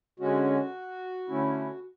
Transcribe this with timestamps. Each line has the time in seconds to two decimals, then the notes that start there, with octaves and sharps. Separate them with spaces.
0.20 D3 G#3 C#4 F#4
1.29 D3 A3 C#4 E4